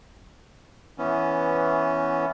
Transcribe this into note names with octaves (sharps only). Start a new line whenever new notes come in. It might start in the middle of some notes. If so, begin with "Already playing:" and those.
E3 B3 C#4